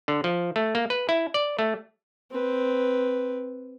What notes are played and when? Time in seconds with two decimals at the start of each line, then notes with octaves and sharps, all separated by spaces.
0.08 D3
0.24 F3
0.56 A3
0.75 A#3
0.90 B4
1.09 E4
1.34 D5
1.59 A3
2.31 C4 B4